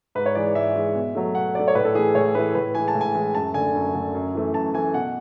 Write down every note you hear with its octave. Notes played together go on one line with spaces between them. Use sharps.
G#2 B4
C#5
E3 G#3 D5
G#2 E5
E3 G#3
B2
F#3 A3
B2 F#5
F#3 A3 D5
C#5
A2 B4
A4
E3 A3 G#4
A2 C#5
E3 A3 B4
A2 B4
E3 G#3 G#5
A5
A2
G#5
E3 G#3
F#2 A5
D3 A3 G#5
F#2
D3 A3
F#2
E3 A3
F#2 A5
E3 A3 G#5
B2 F#5